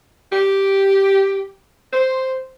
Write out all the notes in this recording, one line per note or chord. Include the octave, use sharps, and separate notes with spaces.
G4
C5